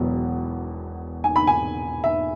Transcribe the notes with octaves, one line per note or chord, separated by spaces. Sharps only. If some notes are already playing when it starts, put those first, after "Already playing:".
Already playing: E1 E2 B2 F#3 B3
G#5
B5
G#5
E5